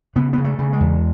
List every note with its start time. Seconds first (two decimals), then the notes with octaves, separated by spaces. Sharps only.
0.16 C#3 B3
0.33 C#3 B3
0.44 A3
0.59 C#3
0.73 G#3
0.80 E2